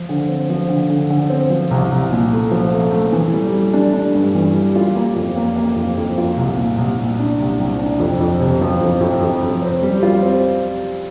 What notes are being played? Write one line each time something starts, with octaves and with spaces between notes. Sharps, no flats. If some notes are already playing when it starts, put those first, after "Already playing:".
Already playing: F3
D3
C4
F3
D3
D3
D3
C4
F3
C2
C2
A#2
A3
F3
A3
A3
E3
G3
G3
D4
D4
G2
E3
G3
F4
A#3
F2
A#3
A#3
F2
F2
F4
C2
A#2
C2
A#2
D4
C2
C2
D4
F2
F2
C3
F3
F2
F2
F2
F2
C4
G3
F4
C4